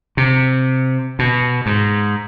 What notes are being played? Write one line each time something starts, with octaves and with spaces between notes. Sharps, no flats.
C3
B2
G#2